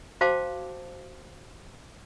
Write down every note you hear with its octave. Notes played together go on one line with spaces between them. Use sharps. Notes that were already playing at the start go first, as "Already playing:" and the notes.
F#4 C5 F5 G5 A5 D6